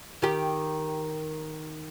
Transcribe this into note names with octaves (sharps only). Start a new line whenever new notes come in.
D#3 G4